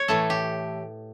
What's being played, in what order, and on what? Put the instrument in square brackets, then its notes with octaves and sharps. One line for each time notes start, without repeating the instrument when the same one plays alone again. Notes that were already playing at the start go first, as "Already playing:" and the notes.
Already playing: [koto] C#5
A2 E3 A3 A4
G4